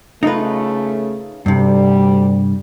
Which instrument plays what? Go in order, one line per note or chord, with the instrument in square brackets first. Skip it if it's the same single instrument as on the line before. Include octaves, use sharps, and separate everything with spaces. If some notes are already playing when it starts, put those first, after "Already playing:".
[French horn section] C#3 A3 [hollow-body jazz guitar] D#4 F4 B4
[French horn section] D2 G3 [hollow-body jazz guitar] G2 C3